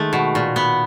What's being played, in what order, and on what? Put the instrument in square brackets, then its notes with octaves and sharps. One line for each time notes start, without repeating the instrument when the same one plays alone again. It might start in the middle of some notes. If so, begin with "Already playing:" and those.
Already playing: [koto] D#3 G#3 A3
B2
A#2
B3